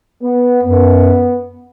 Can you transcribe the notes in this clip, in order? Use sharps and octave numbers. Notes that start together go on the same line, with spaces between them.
B3
F#2 B3